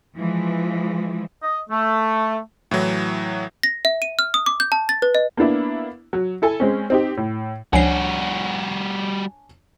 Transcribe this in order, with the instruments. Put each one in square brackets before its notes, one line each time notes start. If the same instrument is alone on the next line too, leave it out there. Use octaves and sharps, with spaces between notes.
[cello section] E3 F3 G#3
[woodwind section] D#5
A3
[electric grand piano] A2 E3 F#3
[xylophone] A#6
E5
D#7
F6
D#6
D6
G6
A5
A6
B4
D#5
[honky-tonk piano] A#3 B3 D4 E4
F#3
E4 A4 G#5
G#3 C4 C#4
C4 D#4 G4
A2
[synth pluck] C#2 F3 C7 [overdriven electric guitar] G3 F#4 [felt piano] D4 C#5 G#5